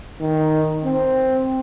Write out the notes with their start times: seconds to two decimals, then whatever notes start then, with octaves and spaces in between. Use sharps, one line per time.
0.21 D#3
0.85 C4